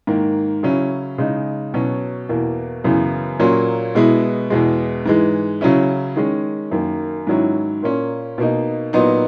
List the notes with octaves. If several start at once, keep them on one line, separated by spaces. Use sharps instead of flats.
G#2 D#3 A#3
C#3 F#3 C#4 E4
C#3 G#3 D#4
B2 F#3 C#4
E2 B2 A#3
F#2 C#3 E3 B3
A#2 F#3 A#3 C#4
B2 G#3 B3 E4
E2 B2 G#3
G#2 E3 G#3
C#3 F#3 C#4 E4
D#3 G#3 C#4
F#2 D#3 A#3
G#2 D#3 F#3 C#4 E4
A#2 A#3 C#4
B2 A#3 D#4
A#2 F#3 B3 D#4